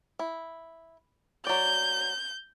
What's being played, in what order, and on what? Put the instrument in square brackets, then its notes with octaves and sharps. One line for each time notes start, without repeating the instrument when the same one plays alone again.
[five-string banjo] E4
[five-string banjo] F#3 D5 [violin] G6